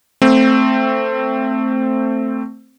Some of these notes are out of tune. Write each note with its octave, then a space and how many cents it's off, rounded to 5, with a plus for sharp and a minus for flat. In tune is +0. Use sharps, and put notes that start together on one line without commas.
A3 +15 C4 +0